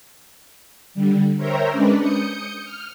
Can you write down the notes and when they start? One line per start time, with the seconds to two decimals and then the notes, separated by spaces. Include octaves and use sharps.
0.94 D3 G3
1.37 A#4 C5 C#5 E5 G5 A#5
1.72 G#3 C#4 D4 B4 D5
2.00 D#6 G6 C#7
2.64 F6